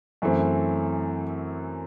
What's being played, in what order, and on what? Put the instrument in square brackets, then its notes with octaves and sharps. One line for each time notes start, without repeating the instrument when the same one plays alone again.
[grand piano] F#2 E3 A3 C4